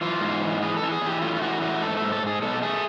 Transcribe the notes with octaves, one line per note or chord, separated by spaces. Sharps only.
E3 F4
G#2
E3
E3 G#4
A4
E3
G#4
E3 G4
A3 F4
F4
E3 F#4
A3 F#4
G#2 A4
A4
G#2
A4
G#2 G#4
B2 A4
A3 G#4